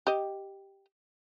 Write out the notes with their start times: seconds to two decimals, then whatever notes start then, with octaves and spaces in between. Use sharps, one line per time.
0.07 G4 D#5